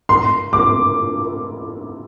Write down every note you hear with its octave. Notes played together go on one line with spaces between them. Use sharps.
C6
D6